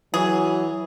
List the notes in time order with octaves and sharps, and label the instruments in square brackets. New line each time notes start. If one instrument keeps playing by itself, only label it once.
[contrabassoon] E3 [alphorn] F#3 [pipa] G#4